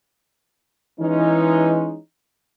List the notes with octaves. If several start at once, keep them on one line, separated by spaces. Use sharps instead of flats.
E3 G#3 C#4 D#4